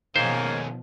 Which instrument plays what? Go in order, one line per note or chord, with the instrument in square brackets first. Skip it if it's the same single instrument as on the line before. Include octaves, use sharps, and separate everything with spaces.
[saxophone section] G#2 A#3 [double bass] B2 F3 [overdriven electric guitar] D#3 C#4 [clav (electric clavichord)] C5